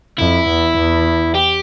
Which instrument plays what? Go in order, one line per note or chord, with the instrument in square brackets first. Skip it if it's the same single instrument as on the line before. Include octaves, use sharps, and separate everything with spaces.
[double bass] F2 [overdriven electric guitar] E4
[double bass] E2
E2
[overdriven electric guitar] G4